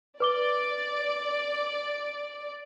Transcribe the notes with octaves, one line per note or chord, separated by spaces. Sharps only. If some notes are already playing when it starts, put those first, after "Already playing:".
B4 D5 D6 G7